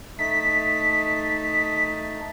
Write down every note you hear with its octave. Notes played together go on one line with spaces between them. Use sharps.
A3 D#4 A5 B6